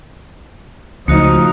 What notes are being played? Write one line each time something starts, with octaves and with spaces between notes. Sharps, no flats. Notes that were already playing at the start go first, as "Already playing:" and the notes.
C#2 F3 A3 D#4 F#4 D#5